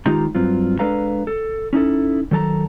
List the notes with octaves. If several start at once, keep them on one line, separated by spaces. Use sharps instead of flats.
D#3 G#3 D#4 F4 G4 A#5
G2 F#3 C4 F4
G#3 D4 A4 B4 F5 A#5
A4
C#4 D#4 E4 A4
D#3 F#3 A4 A5 A#5